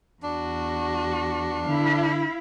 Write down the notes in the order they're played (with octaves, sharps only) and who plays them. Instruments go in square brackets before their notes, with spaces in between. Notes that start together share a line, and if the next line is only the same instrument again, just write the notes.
[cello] E2 F#4 [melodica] D4
[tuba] D3 [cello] E4 F5